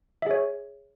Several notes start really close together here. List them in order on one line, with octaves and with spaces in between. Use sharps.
E5 G#4 C#5